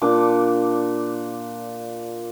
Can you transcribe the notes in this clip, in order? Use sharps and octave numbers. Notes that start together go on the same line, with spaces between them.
A#2 D4 D6